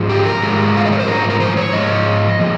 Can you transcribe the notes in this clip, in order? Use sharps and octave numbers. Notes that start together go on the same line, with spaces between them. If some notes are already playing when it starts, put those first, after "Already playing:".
Already playing: G#2 F3 G#3
G4
A#4
G#2 F3 G#3
F5
D#5
C#5
C5
G#2 F3 A#4
A#4
C5
C#5
G#2 F3 G#3 D#5
A#2 F3 G#3